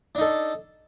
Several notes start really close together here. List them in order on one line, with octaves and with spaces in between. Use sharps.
D4 D#4 A4